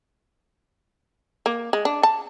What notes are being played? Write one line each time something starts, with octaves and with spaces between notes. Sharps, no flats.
A#3
G#3
D4
A5